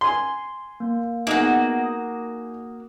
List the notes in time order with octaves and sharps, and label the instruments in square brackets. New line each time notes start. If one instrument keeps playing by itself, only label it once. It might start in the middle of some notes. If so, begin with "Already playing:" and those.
[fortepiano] G#5 C6
[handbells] A#3
[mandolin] A#3 F#4 [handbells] B3 E5 [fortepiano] D#4 G#4
[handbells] D#6